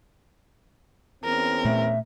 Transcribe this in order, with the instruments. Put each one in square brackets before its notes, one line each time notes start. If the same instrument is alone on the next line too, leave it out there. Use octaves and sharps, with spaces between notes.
[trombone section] E2 C4 C#4 [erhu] A#4
[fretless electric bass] A#2 A3 [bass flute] E5